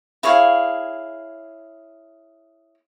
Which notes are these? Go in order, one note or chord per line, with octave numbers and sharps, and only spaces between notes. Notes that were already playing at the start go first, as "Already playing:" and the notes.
E4 G#4 C#5 F5